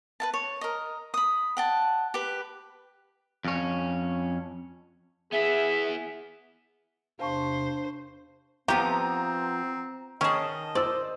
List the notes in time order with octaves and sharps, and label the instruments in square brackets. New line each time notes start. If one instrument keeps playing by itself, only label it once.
[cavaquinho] B4 E5 A5
C#5
A#4 D#5
B5 D#6
F#5 G5 A5
G4 B4
[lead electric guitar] F2 C#4
[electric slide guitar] B3 E4 [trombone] G#4 [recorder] E5
[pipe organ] E2 C3 [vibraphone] D4 [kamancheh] C5 [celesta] F5 A5 C#6
[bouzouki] F3 B3 [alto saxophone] C4 [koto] G4 [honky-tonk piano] A#5
[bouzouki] D#3 A5 [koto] C#4 G#4 [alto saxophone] D#5
[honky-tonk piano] C5 E6 [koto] D5